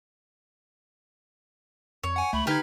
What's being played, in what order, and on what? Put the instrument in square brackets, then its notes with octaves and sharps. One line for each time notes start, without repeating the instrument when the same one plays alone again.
[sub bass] F2 [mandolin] C#5
[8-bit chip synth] F#5 G#5
[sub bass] C#2 [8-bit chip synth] A3 [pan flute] B5
[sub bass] D3 [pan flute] D#4 [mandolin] G4 B4 [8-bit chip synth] F6 G#6